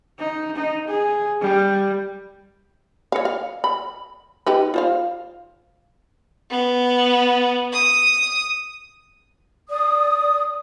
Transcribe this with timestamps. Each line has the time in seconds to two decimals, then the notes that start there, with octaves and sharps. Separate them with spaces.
0.19 D#4
0.56 D#4
0.88 G#4
1.41 G3
3.12 C#5 F5
3.25 F5
3.64 B5
4.47 D#4 G4 B4
4.74 F4 C5 F5
6.50 B3
7.73 D#6
9.69 D5 D#6